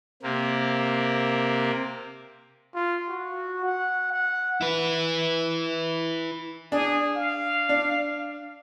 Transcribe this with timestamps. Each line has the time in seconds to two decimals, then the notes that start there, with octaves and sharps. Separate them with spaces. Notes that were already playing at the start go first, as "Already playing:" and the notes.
0.23 C3 A#3
2.75 F4
3.08 F#4
3.64 F#5
4.12 F#5
4.61 E4 B4
6.72 D4 G#4
7.16 F5
7.69 D4